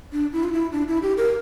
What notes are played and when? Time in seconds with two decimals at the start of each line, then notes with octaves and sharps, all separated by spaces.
0.12 D4
0.33 E4
0.43 F4
0.52 E4
0.72 D4
0.88 E4
1.02 G4
1.17 A#4